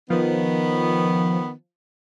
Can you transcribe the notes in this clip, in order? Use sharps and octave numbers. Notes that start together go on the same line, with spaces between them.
D#3 F3 B3